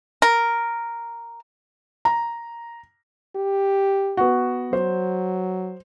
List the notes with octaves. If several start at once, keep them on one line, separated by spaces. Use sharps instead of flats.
A#4
A#5
G4
B3 F#4
F#3 C5